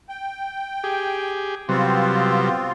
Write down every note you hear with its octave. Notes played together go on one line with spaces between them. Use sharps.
G5
G4 G#4
C3 F#3 G3 B3 C4 F4